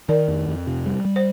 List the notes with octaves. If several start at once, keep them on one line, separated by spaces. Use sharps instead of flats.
D#3 A#4 D5
F2
F2
C3
G3
G3
C5